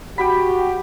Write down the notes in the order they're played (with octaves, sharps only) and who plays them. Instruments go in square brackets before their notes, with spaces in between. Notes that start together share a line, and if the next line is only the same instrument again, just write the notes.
[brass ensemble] F#4 G4 [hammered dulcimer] G5 B5